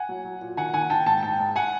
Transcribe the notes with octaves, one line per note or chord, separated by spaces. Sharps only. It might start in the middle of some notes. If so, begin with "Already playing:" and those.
Already playing: F#5 G#5
F#3
F#3
A#2
D#3 F#5 G#5
D#3 F#5 G#5
D#3 G5 A5
G#2 G5 A5
G#2 G5 A5
G#2
F#5 G#5